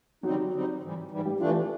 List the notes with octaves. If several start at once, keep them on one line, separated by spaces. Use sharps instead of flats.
D3 F#3 G3 C4 D#4 F#4
D3 G3 C4 D#4
G#2 E3 G3
G#2 E3 G3
G3 G4
C3 E3 F3 A3 D4 F4